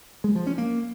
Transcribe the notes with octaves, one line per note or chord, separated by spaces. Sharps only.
G#3
F3
C#4
A#3